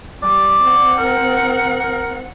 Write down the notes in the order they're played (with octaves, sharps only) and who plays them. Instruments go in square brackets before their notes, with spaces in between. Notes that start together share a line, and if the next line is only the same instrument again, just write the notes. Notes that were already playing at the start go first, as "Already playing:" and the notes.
[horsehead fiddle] G3 [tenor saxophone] D5
[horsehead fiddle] C4 F#5
[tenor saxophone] A#4
A#4